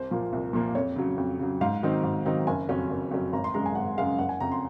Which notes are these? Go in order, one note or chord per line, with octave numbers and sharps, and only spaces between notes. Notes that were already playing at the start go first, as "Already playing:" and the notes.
Already playing: C2 C5
A#2 F3 A#3
C2
A#2 F3 A#3
F2 C#5
C#3 F#3
F2
C#3 F#3
G#2 F5
D#3 F#3 C4 D#4
G#2
D#3 F#3 C4 D#4
F#1 G#5
F2 C#3 F#3 C#4
F#1
F2 C#3 F#3 C#4
G#1 A#5
C6
F#2 C#3 G#3 A#5
G#5
G#1 F#5
F#2 C#3 G#3 F5
F#1 F#5
G#5
F2 C#3 A#5
C6